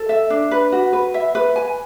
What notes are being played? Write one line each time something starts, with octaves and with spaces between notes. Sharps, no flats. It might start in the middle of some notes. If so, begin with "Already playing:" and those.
Already playing: A4
E5
D4
B4
F#4
B4
E5
B4
G#5